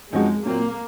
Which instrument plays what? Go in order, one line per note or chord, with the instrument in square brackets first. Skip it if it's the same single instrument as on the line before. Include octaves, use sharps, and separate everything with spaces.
[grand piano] F#2 F3 C4 D#4 F#4 [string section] G#3
[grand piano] A#2 F#3 C4 [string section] A#3